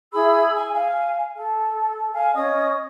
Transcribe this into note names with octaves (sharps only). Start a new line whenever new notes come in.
E4 G#4 B5 E6
G#5
F5 G#5
A4
F5 G#5
C#4 D#5 D#6